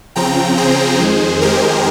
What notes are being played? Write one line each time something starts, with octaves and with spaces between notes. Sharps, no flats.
C#3 F3 C4 G5 A#5
G#4 C5
F2 D#3 G#3
G4 A#4